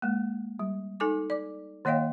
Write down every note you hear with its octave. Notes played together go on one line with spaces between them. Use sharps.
G#3 A#3
G3
D#4 A4 G#5 D6
D5 D6
D#3 A#3 C#5 D#5 F5 G5